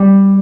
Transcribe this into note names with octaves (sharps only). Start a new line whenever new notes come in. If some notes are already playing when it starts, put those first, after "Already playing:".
Already playing: G3